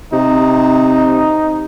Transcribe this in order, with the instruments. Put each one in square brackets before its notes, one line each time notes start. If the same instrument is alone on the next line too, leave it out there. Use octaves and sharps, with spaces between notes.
[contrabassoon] C3 [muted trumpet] D#4